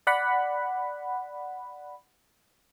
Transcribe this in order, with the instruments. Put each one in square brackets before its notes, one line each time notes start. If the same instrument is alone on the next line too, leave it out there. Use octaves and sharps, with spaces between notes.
[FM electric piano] D5 F#5 B5